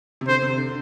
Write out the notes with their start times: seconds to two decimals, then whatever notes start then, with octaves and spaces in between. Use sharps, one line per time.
0.21 C3
0.28 D3 C5
0.42 C3
0.57 D3